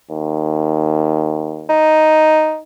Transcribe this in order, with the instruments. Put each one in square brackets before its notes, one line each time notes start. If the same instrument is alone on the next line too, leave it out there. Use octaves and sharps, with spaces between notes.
[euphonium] D#2
[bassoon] D#4